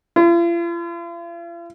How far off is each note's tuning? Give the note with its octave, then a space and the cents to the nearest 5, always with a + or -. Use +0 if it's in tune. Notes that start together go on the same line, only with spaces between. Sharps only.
F4 -45